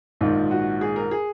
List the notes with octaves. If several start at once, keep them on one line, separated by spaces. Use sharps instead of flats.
A#1 G#2 D#3 F4
F#4
G#4
A#4
G#4